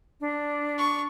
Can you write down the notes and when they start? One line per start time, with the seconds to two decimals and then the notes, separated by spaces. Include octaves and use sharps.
0.21 D4
0.78 C#6